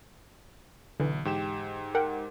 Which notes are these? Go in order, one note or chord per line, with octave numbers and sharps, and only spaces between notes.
B1 D3 E3
G#2 G4 E7
A#4 F#5 G5